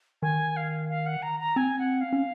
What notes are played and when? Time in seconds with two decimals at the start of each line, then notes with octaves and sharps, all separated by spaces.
0.22 D#3 G#5
0.57 F5
0.89 F5
1.06 F#5
1.22 A#5
1.40 A#5
1.56 C4 G#5
1.79 F#5
2.01 F5
2.13 C#4